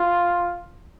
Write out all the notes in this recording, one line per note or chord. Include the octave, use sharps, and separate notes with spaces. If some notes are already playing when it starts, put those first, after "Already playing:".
Already playing: F4